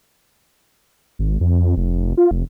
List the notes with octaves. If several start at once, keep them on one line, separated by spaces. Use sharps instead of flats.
G#1
F2
F1
F4
F1